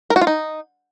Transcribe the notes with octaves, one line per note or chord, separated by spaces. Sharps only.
A#4
F#4
F4
D#4